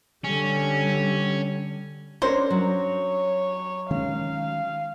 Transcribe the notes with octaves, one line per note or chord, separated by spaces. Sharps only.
D3 G3 C#4
C#4 D4 A#4 C5 C#5
F#3 C#5
D#3 G#3 C#4 F5